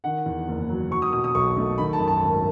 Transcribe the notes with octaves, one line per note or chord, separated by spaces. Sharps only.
D#3 F#5
E2
F#1
F#3
F#3 C#6
D#6
B2 D#6
D#6
B1 C#6
A3
D#3 B5
A5
F#2
A5
G#1